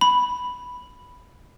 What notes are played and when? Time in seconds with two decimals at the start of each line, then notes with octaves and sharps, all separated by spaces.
0.01 B5